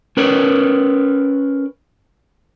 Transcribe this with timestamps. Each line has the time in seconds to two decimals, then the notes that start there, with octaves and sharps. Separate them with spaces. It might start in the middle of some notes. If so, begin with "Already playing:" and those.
0.17 C#4 A#4 B4 C#5